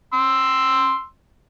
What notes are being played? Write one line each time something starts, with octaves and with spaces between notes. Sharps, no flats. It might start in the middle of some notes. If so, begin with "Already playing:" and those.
C6 E6